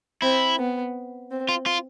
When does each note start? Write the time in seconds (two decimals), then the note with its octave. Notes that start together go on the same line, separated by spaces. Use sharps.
0.22 C4 E4
0.58 B3
1.31 C4
1.49 F4
1.66 F4